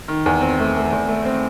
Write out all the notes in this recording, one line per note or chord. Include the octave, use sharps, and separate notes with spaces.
D#3
E2
C4
A3
A3
E2
A3
C4